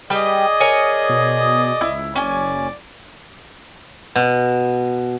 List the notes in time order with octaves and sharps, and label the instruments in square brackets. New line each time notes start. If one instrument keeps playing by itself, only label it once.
[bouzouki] G3 B4 G5 [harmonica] G#4 D5 D#5
[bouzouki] A#4 C#5 G#5
[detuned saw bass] B2
[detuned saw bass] C#2 [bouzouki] E4
[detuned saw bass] F#1 [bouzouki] C#4 G#5 [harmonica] D5
[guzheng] B2